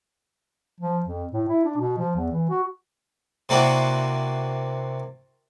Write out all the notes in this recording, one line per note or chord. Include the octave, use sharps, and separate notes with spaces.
F3
F2
A2
E4
D4
B2
F3
E2
E3
F#4
C3 A#3 C4 D4 E4 F#4